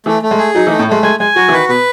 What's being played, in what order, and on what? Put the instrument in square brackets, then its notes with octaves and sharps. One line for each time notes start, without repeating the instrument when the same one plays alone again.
[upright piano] E3 [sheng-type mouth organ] A3
[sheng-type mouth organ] A3
[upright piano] G#3
[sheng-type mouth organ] G#4
[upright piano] F#3 [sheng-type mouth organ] D#4
[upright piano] E3
[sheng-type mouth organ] A3
[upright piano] A2
[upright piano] G#3 [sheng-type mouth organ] A3
[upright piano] G#3 [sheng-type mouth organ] G#5
[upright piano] G#3 [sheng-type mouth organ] G#5
[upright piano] F#3 [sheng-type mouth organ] F#4
[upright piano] E3
[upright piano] D#3 [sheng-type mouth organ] B4
[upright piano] B2 [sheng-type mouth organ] B4